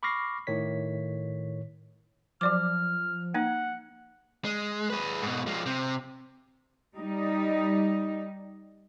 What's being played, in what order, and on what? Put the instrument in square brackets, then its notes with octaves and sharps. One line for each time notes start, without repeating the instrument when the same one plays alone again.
[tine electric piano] B5 C#6 D6 F6 A#6 C7
A2 D#3 C#5 B6
[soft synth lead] F3 [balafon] F#3 D5 D6 [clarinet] F6
[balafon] A#3 D#4 [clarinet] F#5
[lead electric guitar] G#3
G#4 B4
G#2 B2
F3 G#3
C3
[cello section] G3 D#4